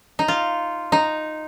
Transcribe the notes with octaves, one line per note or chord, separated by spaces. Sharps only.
D#4
F4
D#4